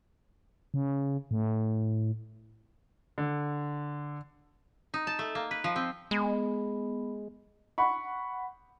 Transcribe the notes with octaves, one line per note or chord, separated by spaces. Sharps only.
C#3
A2
D3
D#4
A5
A3
A#3
B4
F3
C4
G#3 B3
F#5 B5 C#6